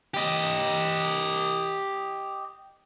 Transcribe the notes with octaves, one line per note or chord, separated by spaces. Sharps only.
G4 D#5